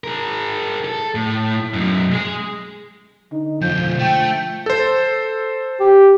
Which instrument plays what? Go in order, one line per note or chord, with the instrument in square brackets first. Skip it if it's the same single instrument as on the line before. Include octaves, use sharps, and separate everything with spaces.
[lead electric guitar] G#4 A#4
A4
A2
F#2 B2
G#3 G#4
[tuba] D3 [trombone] D#4
[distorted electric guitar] F2 B2 [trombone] F3 [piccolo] G6
[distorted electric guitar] A3 [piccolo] G5
[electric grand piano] A4 C5
[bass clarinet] G4